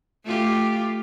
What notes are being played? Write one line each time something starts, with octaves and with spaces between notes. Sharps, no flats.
A3 F4 G4